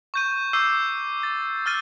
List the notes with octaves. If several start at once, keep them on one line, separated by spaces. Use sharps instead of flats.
C#6 G6 D#7
C#6 D6 E6 G6 C7 D#7
A6
E6 F6 A6 D#7